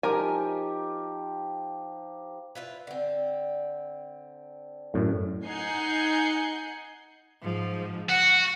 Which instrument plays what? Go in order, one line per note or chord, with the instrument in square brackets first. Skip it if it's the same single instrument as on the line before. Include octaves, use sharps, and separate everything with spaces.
[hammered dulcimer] F3 D#4 G4 [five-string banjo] A#4 G#5
[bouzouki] E4 F4 B4
D3 C4
[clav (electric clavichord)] F#2 A2
[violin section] D#4 F#5 G#5 G6 G#6 C7
[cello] G#2 F3
[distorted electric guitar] F#4 [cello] F#5